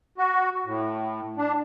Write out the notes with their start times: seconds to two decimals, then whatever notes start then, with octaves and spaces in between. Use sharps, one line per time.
0.18 F#4
0.66 A2
1.37 D4